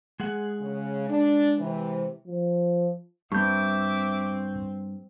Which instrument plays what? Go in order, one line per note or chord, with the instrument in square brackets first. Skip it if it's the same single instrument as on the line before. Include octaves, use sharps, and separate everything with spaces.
[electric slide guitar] G#3 G#4 F#5
[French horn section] C#3
D4
C3 E3
[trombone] F3
[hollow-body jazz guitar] G2 [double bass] C4 [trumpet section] E5 D6 [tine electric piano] C#6 G6